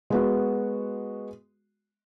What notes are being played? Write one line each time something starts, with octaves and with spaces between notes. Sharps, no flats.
G#3 B3 F#4